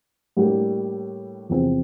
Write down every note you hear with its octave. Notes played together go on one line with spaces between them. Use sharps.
A2 G3 A#3 D4 G4
E2 C3 F3 C4